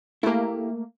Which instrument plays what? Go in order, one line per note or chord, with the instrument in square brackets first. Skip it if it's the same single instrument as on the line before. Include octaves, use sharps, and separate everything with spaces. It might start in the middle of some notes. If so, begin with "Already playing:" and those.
[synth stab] A3 A#3 [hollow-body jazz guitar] E4 G4